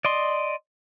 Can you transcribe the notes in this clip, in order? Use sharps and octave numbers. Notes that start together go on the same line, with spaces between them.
D5 D#5 C6